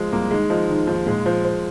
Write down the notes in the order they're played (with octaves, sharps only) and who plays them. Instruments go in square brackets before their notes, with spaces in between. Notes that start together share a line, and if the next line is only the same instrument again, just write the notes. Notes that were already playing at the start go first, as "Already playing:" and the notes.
Already playing: [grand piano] F3 G#3
[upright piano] C2 [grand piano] A#3
[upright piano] D#3 [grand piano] G#3
[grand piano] F3 [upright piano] D#4
[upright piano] D#3
[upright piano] D#2 [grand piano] F3
[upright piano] A#2 [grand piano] G#3
[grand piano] F3 [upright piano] C5
[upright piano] C5